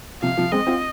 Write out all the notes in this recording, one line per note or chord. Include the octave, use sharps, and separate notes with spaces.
C3 F3 F5
C3 F3
G#3 C4 D#5
C4 F4